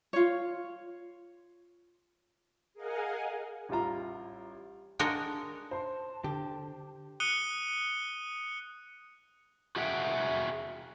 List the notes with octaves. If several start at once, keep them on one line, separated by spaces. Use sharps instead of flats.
F4 C#5
G#4 A#4 D#5 F5 F#5 G#5
A1 G3 E4 F4 A#5
G#3 D4 F#4 A#4 C#5 D#5
C5 A5 C6
D3 G4
D#6 F#6 C#7 D#7 G7
F#4 G#4 E5 F#5 G5